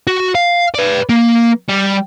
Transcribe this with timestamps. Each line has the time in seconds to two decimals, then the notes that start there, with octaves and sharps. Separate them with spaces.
0.07 F#4
0.35 F5
0.74 B4 D5
1.09 A#3
1.69 G3